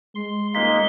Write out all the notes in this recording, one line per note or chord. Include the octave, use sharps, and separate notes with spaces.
G#3 C6
D#1 G#3 A#3 D#4 B6 G7